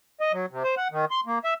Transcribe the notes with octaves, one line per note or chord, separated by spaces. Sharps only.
D#5
F#3
C3
C5
F#5
D#3
C6
A#3
E5